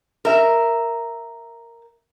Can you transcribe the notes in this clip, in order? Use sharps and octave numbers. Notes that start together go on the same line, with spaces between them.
A#4 E5